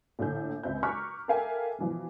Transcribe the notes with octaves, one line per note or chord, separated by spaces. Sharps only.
A#1 A2 D3 G6
C#2 C4 E5 G6
A#5 C#6 D6 F6 F#6 B6
A4 A#4 E5 F5 G5 G#5
B2 E3 F3